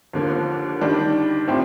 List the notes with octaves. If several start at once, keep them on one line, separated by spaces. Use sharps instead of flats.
D#2 D3 F3 A#3
D#3 G3 D4
A2 F3 C4 G4